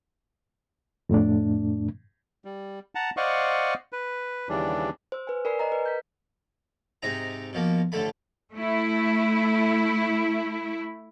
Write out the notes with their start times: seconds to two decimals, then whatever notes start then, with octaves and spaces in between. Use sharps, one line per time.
1.09 F2 A2 A3 D4
2.45 G3
2.95 F#5 A5 A#5
3.17 C5 D5 D#5 F5 F#5 C#6
3.92 B4
4.49 D#2 C#3 E3 G3 D4
5.12 C5 E6
5.27 B4 G#5
5.45 A#4 D5 G#5 B5 C7
5.59 A#4 C5 D#5 A#5
5.72 B4
5.86 G6 B6
7.03 G#2 C3 D#4 A#5
7.53 B2 F3 A#3
7.92 A1 D3 A3 B5
8.53 A3 E4